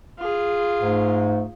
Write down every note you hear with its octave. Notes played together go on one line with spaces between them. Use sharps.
F4 G#4
G#2 A3